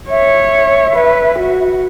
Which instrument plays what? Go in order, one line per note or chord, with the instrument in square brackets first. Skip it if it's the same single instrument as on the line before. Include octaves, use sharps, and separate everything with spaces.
[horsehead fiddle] C#5 [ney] E5
[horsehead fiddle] B4
F#4